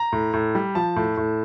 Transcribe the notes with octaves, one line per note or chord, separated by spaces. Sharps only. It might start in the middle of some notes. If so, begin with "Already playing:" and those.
Already playing: A#5
A2
A2
G3
F3 A5
A2
A2